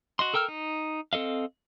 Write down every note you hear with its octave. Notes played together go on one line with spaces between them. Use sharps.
F#4 D#5 C6
A4 A#4 G5 E6 F6
D#4
C4 A4 D#5 F5